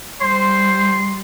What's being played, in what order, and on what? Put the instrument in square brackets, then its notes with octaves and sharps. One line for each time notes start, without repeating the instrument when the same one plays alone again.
[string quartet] G3 [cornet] C5 [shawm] C6